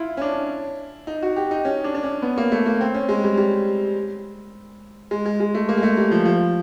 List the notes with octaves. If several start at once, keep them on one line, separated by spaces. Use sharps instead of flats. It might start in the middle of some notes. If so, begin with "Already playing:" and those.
Already playing: E4 F4
C#4
D4
D#4
F#4
G4
D#4
C#4
D4
D4
C#4
B3
A#3
A3
A#3
C4
C#4
G#3
G3
G3
G#3
G#3
G#3
A3
A#3
G#3
A3
G3
F3
F3